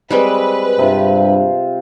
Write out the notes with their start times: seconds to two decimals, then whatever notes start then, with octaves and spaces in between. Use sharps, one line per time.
0.10 G3 G#3 C4 B4
0.79 G2 C3 F4